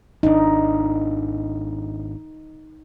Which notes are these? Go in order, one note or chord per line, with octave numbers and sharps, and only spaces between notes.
G#1 D4 D#4